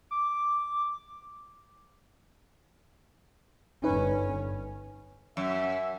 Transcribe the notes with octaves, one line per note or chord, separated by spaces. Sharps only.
D6
G1 C#4 D#4 B4
F#2 E5